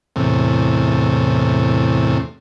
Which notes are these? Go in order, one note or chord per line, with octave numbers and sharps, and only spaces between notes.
E2 A2 C3